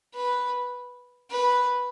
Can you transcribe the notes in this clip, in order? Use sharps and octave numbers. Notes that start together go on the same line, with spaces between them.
B4
B4